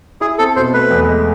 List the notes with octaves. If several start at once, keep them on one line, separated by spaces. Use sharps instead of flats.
E4 G#4
C4 A4
B2 C5
A3 B4
E2
G#3